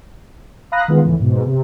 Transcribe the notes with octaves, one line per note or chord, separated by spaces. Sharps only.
F5 A#5 B5 D#6 F#6 A#6
D#3 G#3 B3 F4
C#2 A2 E3
G#2 B2
C3